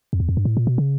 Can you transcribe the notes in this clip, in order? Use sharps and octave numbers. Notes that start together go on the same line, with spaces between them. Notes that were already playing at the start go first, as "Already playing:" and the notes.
F2
E2
F2
G2
A2
A#2
B2
C#3